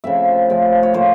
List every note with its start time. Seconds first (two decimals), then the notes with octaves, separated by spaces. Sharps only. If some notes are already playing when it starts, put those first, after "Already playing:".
0.04 C#3 F3 A3 C4 E5
0.50 C#3 F3 A3 C4
0.83 C#5
0.94 A2 F3 A#3 C5